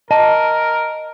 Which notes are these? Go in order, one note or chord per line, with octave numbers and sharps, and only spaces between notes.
A#4 D#5 A5